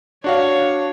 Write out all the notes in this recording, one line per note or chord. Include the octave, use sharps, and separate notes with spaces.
D4 F#4 C#5 F5